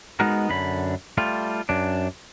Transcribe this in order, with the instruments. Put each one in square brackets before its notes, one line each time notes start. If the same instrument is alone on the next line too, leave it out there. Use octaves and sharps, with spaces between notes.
[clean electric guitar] G#3 B3 D#4 F#4 A#4
F#2 D3 B5
G3 A3 F4
F#2 D4